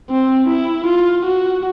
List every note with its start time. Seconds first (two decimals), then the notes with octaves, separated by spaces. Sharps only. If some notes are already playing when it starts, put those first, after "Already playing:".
0.10 C4
0.48 E4
0.87 F4
1.25 F#4